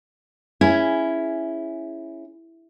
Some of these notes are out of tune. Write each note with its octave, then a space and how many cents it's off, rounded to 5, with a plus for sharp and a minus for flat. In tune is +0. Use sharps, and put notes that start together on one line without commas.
C#4 +0 E4 +0 G#4 +0